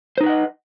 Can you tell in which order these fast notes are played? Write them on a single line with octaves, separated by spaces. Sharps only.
C5 D#4 B4 F#5 D#5